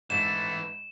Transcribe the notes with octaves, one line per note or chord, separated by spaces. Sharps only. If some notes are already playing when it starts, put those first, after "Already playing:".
G#2 E3 A3 E7